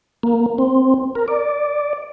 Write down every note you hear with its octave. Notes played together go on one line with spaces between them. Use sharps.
A#3
C4
A#4
D5